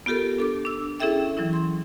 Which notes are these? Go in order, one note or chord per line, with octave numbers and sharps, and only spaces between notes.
B3 F4 G4 A4 A#4
D4 A4 D6
D4 E6
C#4 E4 G#4 A4 E5 G5
E3 F#3 C#4 E4
C6